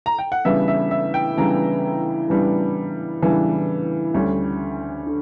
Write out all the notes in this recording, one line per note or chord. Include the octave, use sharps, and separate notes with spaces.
A#5
G5
F#5
C#3 E3 G3 B3 D4 E5
E5
E5
G5
C#3 E3 G3 B3 D4 A#5
C#3 E3 G3 B3 D4
C#3 E3 G3 B3 D4
D2 D3 G3 C#4
D3